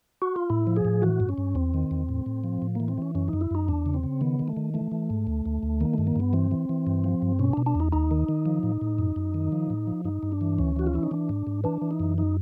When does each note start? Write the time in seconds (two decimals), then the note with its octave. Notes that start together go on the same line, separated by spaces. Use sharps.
0.22 F#4
0.36 F4
0.50 A2 E4
0.67 F3
0.76 G#4
0.85 A2
1.02 E3 F#4
1.20 G2
1.29 C#4
1.38 G2
1.55 E2 C4
1.74 D#3
1.91 E2
2.09 A2
2.26 A2
2.44 F3
2.62 A2
2.75 E3 A#3
2.88 C4
2.98 E3 C#4
3.15 F#2 C#4
3.28 F#2 D#4
3.41 E4
3.51 F#2 D#4
3.68 E2 D4
3.86 C#3
3.94 C4
4.03 C#3
4.21 D#3 B3
4.39 D#3
4.48 A3
4.57 D#3
4.74 E3 A3
4.92 E3
5.10 G#2
5.27 D2
5.46 D2
5.63 D2
5.80 D#3 A#3
5.93 G2 A3
6.07 A#3
6.16 G2 B3
6.33 E3 C4
6.51 E3
6.69 E3
6.87 G2
7.04 F3
7.22 G2
7.39 B2 C#4
7.53 B2 D4
7.66 D4
7.75 E2 D#4
7.92 D#2 D#4
8.11 D#3
8.29 D#3
8.46 F3
8.63 A2
8.81 A2
8.98 F#2
9.16 F#2
9.34 D#3
9.52 F3
9.70 A2
9.87 F3
10.05 G2 D#4
10.23 G2
10.32 D4
10.41 E3
10.58 D2 C#4
10.76 E3 F#4
10.87 F4
10.94 E3 E4
11.03 D#4
11.11 E3 D4
11.29 G#2
11.47 G#2
11.64 E3 D4
11.82 E3
11.91 D#4
12.00 F#2
12.18 D#4